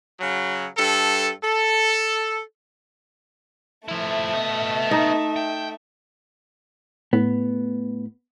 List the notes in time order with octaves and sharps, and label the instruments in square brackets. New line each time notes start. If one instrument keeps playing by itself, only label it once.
[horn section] C#3 F#3
G2 A4
A4
[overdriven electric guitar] F3 E4 [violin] A3 E5
[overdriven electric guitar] B3 D#5
[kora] D#4
[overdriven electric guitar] G5
[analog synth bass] A2 [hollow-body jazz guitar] B3